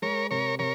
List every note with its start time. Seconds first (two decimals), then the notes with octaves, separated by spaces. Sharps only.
0.02 G#3 A#4 C#5
0.31 C3 A#4 C#5
0.59 C3 A#4 C#5